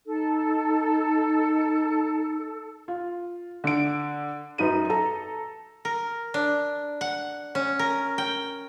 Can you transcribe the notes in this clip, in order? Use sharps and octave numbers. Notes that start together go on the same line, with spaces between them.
D#4 A4
F4
D3 D7
F#2 D#4 B4 D#7
A4 A#5
A#4
D4
F#5
C#4
A#4
G5